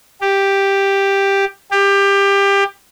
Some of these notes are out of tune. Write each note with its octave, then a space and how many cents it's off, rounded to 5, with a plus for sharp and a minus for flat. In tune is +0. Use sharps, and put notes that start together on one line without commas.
G4 +5
G4 +20